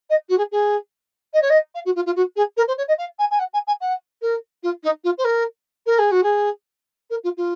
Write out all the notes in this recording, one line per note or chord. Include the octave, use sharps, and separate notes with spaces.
D#5
F#4
G#4
G#4
D#5
C#5
D#5
F5
F#4
F4
F4
F#4
G#4
A#4
C5
C#5
D#5
F5
G#5
G#5
F#5
G#5
G#5
F#5
A#4
F4
D#4
F4
C5
A#4
A#4
G#4
F#4
G#4
A#4
F4
F4